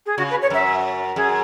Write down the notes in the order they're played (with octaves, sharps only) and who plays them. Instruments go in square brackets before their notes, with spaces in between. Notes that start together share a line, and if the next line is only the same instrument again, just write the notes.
[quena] G#4
[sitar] C#3 [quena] F#4
[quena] B4
C#5
[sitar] F#2 [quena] E5
[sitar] F#2 [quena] G#4